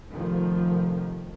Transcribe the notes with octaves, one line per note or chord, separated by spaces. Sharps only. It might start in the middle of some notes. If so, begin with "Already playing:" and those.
F1 D#3 F3